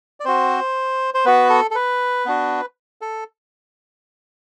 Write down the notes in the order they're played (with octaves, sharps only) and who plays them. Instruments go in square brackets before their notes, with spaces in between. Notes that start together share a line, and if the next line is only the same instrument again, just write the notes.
[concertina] D5
C4 F#4 C5
C5
B3 F#4 B4
A4
A4
B4
B3 D4 F#4
A4